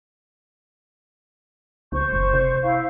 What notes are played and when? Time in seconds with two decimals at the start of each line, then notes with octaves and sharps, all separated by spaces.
1.92 C#2 C5 C#6 G6
2.12 F#1
2.34 C3
2.63 E4 F5